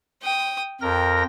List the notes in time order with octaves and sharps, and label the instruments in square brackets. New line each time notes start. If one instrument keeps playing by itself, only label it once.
[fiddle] G5 D#6
[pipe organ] F2 A#4 A#6 [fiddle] G5